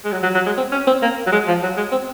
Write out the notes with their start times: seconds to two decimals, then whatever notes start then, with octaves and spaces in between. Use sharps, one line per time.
0.04 G#3
0.12 F#3
0.23 F#3
0.34 F#3
0.46 G#3
0.57 C4
0.72 C#4
0.87 C4
1.02 A#3
1.26 F#3
1.32 G#3
1.47 F3
1.62 F#3
1.77 G#3
1.91 C4